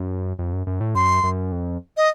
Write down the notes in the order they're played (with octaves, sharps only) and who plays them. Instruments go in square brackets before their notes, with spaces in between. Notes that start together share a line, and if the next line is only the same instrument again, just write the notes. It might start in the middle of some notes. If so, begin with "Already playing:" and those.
Already playing: [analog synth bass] F#2
F2
F#2
F#2
A2
[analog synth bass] F#2 [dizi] C6
[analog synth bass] F#2
F2
[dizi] D#5